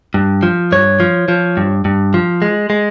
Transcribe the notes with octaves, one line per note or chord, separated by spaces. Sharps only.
G2
F3
G2 C#5
F3
F3
G2
G2
F3
G#3
G#3